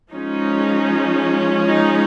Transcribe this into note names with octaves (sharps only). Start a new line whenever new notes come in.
F3 G#3 C#4 D#4
D#4